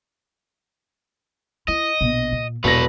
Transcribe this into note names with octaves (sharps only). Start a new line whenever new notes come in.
E4 D#5
A#1 B2
A#2
E1 E3 F#3 B4 C#5 A#6